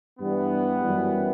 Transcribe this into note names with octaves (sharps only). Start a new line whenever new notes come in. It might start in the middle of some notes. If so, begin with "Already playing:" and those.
G2 E3 G3 B3
F#2 E3 G3